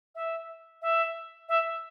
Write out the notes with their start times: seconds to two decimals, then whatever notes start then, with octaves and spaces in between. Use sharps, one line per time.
0.15 E5
0.82 E5
1.49 E5